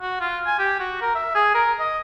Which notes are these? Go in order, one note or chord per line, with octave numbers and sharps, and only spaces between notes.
F#4
F4
G#5
G4
F#4
A#4
E5
G#4
A#4
D#5